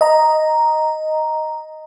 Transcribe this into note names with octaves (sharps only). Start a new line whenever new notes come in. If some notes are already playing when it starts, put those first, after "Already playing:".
D#5 A#5